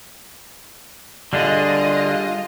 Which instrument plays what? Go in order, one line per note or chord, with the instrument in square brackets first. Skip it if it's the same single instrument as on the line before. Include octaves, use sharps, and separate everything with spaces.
[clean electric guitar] D3 [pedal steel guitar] G3 D4 G#4 [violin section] F4 D#5